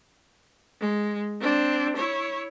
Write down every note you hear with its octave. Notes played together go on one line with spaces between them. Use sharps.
G#3
C4 D4
E4 C#5